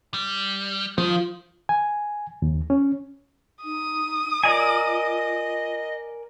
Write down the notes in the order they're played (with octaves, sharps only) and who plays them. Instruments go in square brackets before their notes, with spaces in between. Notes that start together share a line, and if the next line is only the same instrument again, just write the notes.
[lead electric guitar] G3
[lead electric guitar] D#3 [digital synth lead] F3
[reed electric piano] G#5
D#2
C#4
[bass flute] D#4 [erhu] D#6
[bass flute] F4 [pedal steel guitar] A#4 D5 G#5 [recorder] D#5